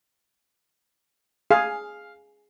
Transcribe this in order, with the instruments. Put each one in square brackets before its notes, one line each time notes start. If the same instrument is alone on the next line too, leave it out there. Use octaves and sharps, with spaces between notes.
[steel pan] G#4 [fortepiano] F5